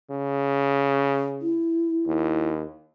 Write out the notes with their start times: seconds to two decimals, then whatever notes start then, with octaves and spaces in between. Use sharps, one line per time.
0.10 C#3
1.42 E4
2.07 D#2